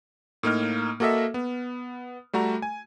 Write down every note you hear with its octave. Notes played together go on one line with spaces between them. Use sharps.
A2 A#3 D#4 F6
A#3 F#4 A4 D#5 E5
B3
G3 A3 F#4 A#5
G#5